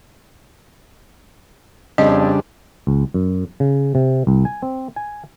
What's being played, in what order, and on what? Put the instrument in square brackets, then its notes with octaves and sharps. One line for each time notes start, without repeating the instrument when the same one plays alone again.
[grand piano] F2 [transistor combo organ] C#3 G3 D4 [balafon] D#5
[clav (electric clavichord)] C#2
F#2
C#3
C3
C2
G#5
C4
G#5